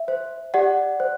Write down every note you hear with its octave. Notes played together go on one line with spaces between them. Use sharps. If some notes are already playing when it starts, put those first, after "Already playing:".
Already playing: E5
C5
G4 D5 F#5
C5